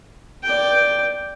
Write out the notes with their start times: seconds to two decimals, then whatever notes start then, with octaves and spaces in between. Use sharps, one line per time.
0.43 D5 G5